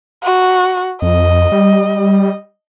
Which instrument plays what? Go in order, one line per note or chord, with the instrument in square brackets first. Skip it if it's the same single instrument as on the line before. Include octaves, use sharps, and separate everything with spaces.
[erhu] F#4
[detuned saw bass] F2 [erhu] D#5
[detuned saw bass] G3